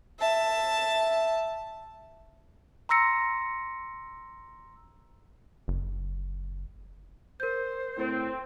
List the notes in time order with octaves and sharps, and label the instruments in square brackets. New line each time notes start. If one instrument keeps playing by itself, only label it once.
[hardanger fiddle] E5 A5
[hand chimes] A#5 C6 E6 A#6 C#7
[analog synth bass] F#1
[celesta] A#4 G6 [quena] C5
[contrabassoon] A2 [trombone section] C4